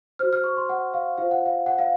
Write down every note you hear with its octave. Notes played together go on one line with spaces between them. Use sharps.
F#4 C5 F6
F6
C#6
C6
F#5
F5
F4 C5 F5
F#5
F5
F#5
F5